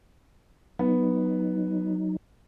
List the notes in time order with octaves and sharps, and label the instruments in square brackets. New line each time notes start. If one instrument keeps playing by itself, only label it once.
[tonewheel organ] F#3 D#4 [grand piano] B3